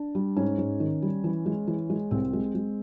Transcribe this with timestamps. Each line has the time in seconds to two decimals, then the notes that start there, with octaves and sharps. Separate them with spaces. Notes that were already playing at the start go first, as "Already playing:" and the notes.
Already playing: D4
0.15 G3
0.36 G#2 C#4
0.58 G#2
0.80 D#3
1.02 G3
1.24 E3
1.46 G#3
1.67 E3
1.90 G#3
2.11 C2 C4
2.33 G#3
2.55 G#3